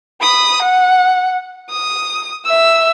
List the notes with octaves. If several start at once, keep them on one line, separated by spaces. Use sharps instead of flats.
B5 D#6
F#5
D#6
E5 E6